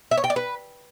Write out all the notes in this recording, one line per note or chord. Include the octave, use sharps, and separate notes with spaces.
E5
C#5
G5
D5
B4